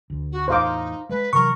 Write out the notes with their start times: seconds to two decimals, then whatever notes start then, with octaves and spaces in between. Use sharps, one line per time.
0.10 D2
0.31 F#4
0.48 E2 A2 D#4 C5 F5 D6
1.09 G#3 B4
1.33 C3 E3 F#3 A#4 C#6